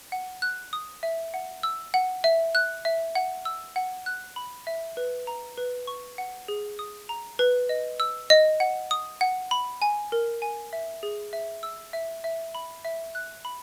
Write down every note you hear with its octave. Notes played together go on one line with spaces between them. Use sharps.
F#5
F#6
D#6
E5
F#5
E6
F#5
E5
F#6
E5
F#5
E6
F#5
F#6
B5
E5
B4
A#5
B4
C#6
F#5
G#4
D#6
A#5
B4
D#5
E6
D#5
F#5
D#6
F#5
B5
G#5
A#4
G#5
E5
G#4
E5
E6
E5
E5
B5
E5
F#6
B5